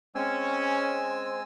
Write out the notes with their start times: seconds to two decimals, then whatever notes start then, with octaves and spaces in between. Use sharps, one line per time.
0.15 G#3 C4 C#4 G#5 E6